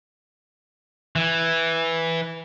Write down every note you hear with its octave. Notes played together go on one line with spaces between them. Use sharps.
E3